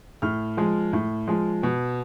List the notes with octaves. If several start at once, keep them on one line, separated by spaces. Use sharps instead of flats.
A2 F6
F3 G#3
A2
F3 G#3
B2